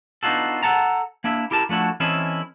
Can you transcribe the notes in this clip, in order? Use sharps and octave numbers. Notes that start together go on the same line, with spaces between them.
B3 D4 D#4 F4 F#4 A4
A4 F#5 A5 A#5
A#3 D4 E4 E5
E4 G4 A#4 A5
F3 A3 D4 E4 F#4
E3 C4 C#4 E4 A4 D#5